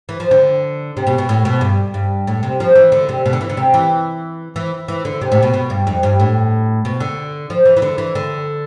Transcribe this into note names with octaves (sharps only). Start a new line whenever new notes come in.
E3
F3
D3
C3
B2
B2
A2
B2
G2
G2
A2
C3
F3
E3
D3
C3
B2
D3
E3
D3
C3
E3
E3
E3
D3
C3
A2
B2
B2
G2
F2
G2
A2
B2
D3
F3
E3
E3
D3
E3
D3